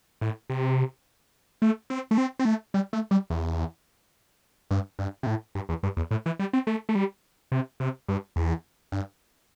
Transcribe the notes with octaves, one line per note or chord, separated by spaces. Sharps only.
A2
C3
A3
C4
A3
C4
C4
A3
G3
A3
G3
E2
G2
G2
C3
A2
G2
E2
G2
E2
A2
E3
G3
C4
A3
A3
G3
C3
C3
G2
E2
G2